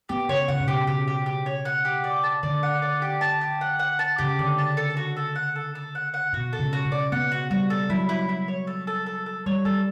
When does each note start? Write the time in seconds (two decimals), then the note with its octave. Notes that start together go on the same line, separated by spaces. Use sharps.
0.09 B3 G4
0.29 C#3 C#5
0.48 C#3 F#5
0.60 B2
0.67 C#3 G4
0.87 C#3 G4
1.08 G4
1.26 G4
1.46 C#5
1.65 F#5
1.85 G4
2.04 D5
2.23 A5
2.43 D3 D5
2.63 F#5
2.82 D5
3.02 G4
3.21 A5
3.41 G4
3.61 F#5
3.79 F#5
3.99 A5
4.18 C#3 G4
4.39 D3 D5
4.58 A5
4.77 A4
4.97 F#4
5.17 A4
5.35 F#5
5.56 A4
5.75 A4
5.95 F#5
6.14 F#5
6.33 B2 F#4
6.53 A4
6.59 C#3
6.73 F#4
6.85 C#3
6.92 D5
7.12 B3 F#5
7.32 F#4
7.51 G3 F#4
7.70 A4
7.89 F#3 E4
8.09 E4
8.29 E4
8.48 C#5
8.67 A4
8.87 A4
9.06 A4
9.26 A4
9.46 G3 C#5
9.65 G3 A4